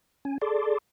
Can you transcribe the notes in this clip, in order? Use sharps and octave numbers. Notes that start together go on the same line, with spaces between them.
C#4 G#5
G#4 A4 D5 A5 C6 D6